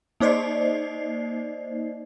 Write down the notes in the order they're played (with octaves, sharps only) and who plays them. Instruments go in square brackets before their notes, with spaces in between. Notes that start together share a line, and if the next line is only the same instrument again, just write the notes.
[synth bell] A#3 D#4 C5 D5 D#5 C7